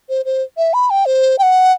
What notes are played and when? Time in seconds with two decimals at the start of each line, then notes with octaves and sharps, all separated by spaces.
0.09 C5
0.25 C5
0.57 E5
0.74 B5
0.90 G5
1.06 C5
1.39 G5
1.43 F#5